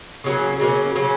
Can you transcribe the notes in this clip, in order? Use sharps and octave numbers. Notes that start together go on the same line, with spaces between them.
C#3 F#3 A#3 C#4
C#3 F#3 A#3 C#4
C#3 F#3 A#3 C#4